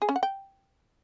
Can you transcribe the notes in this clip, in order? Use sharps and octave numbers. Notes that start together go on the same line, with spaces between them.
G#4
C#4
F#5
G5